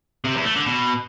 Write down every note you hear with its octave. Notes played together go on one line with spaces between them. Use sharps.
C3
E2
A3
D3
B2